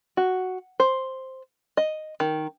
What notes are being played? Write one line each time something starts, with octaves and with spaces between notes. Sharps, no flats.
F#4
C5
D#5
D#3